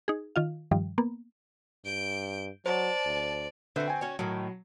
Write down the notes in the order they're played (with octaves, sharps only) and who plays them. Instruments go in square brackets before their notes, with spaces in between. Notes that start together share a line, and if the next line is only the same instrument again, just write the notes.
[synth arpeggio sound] D#4 G#4
D#3 F4 F5
G2 D#3 F3 G3
A#3 B3
[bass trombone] G2 [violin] G6 D7
[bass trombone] F#3 [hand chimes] C5 [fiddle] D5 [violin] A5
[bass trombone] D2
[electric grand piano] D3 B4 E5 [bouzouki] C4 F#4
[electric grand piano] G5 G#5
[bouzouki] C#4 F#4 C#5
[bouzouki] A2 D#3 [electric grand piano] F#3